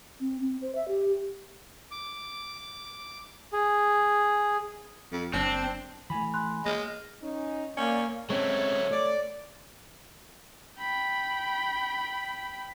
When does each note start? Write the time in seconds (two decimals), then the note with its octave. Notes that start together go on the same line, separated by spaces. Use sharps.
0.20 C4
0.41 C4
0.61 C5
0.75 E5
0.88 G4
1.91 D6
3.53 G#4
5.11 F2
5.33 F#1 C4 D4
6.10 E3 A3 G#5 B5
6.34 C6 F#6
6.66 G#3 A#3 F6 A#6
7.22 C#4 D#4
7.77 A#3 C#4 D5
8.30 F#3 G#3 A3 C4 C#4 C#5
8.91 A3 D5
10.79 G5 B5